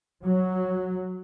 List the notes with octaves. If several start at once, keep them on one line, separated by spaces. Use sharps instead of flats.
F#3